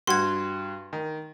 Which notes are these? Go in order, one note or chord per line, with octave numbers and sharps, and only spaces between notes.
G2 F#4 C6 G#6
D#3